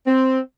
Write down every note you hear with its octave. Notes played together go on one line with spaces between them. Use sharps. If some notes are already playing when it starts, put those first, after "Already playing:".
C4